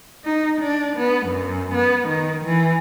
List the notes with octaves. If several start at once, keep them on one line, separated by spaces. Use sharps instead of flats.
D#4
D4
B3
F#2
B3
D#3
E3